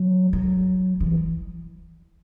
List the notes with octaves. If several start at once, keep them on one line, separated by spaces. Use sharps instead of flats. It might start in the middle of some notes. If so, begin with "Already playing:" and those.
Already playing: F#3
F#3
E3